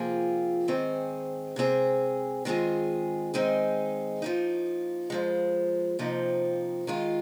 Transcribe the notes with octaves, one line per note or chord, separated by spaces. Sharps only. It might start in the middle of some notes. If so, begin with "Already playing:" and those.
Already playing: C3 F3 A#3 F4 G#4
G#2 D#3 C4 G#4
C3 G#3 C4 G#4
D#3 G#3 C4 F4 G#4
D#3 G#3 C4 D#4 G#4
F3 A#3 D#4
F2 F3 G#3
F2 C3 F3 A#3 D#4
D#3 G#3 F4